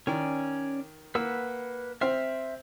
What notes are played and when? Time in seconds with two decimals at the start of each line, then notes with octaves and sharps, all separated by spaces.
0.07 D#3 C#4 D5
1.15 A#3 B4 F#5 E6
2.01 C4 C5 E5 F6